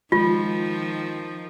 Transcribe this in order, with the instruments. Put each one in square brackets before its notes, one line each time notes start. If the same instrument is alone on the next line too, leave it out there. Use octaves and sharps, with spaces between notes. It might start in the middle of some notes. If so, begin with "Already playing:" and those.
[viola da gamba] D#3 F3 [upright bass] G#3 [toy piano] F4